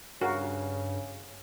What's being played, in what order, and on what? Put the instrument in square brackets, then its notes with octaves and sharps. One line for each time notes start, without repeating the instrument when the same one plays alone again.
[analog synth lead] G2 [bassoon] C#3 [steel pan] F#4 A#4 F5